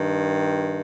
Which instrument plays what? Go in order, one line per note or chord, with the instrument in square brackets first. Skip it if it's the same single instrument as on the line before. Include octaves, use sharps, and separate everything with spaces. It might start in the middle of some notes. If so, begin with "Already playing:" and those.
Already playing: [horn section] G2 D#3